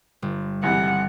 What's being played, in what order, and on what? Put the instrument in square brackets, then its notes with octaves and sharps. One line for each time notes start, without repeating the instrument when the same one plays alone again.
[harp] G1
[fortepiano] G#1 C3 E3 [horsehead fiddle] F#5